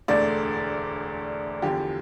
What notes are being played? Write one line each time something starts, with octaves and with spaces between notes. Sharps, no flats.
E1 D2 D3 A3 D5
E2 D3 F3 G4